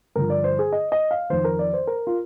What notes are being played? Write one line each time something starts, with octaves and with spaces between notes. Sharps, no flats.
G2 D3 F3 A#4
D5
C5
G#4
D#5
D#5
F5
F2 D#3 C5
A#4
D5
C5
A#4
F4